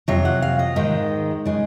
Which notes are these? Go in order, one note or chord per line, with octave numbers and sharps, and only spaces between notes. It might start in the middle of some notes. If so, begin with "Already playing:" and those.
F2 C3 F#3 F5
F#5
F5
D#5
G#2 D#3 G#3
C#3 G#3